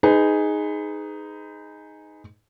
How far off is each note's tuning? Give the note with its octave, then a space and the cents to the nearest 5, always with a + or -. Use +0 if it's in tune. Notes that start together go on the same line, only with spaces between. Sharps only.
D#4 +0 G#4 +0 B4 +30